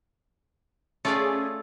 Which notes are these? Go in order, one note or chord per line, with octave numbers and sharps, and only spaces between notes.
A3 C#4 F4 G#4 D5